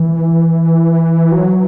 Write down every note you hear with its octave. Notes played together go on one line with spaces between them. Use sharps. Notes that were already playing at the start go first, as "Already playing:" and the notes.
Already playing: E3
F#3